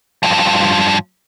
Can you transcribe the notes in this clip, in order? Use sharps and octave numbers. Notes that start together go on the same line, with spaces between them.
G2 F3